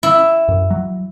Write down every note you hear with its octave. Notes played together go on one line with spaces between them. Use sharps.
E4
F#2
F#3